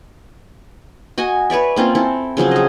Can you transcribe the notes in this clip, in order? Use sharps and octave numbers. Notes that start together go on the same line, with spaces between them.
F#4 D#5 G#5
B4 C#5 D5 E5
A#3 C4 C#4 F4
C4 E4 A4
C#3 F3 F#3 C4
G#4 D#5